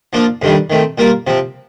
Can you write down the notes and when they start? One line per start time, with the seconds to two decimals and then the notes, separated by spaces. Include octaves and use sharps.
0.13 F3 A#3 D4 F4
0.42 F2 C3 D#3 G3 D4
0.70 D#3 A3 C4
0.98 A#2 G3 A#3 F4 A#4
1.27 C3 F3 C4